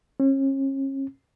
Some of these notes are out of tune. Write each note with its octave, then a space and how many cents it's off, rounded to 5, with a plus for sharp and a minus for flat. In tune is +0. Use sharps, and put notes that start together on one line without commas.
C#4 -35